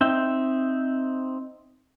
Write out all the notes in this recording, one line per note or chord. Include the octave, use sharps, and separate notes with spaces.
C4 D#4 E5 G5